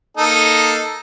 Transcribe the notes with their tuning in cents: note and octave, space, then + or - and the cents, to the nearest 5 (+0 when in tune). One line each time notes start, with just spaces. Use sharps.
A#3 +0 D#4 +0 A4 +0